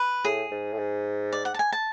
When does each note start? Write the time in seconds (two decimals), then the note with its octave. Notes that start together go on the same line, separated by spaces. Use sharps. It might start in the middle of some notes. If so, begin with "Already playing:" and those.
Already playing: B4
0.24 A2 G#4
0.51 G#2
0.72 A2
0.78 G#2
1.32 D5
1.45 F#5
1.54 A5
1.59 G#5
1.72 A5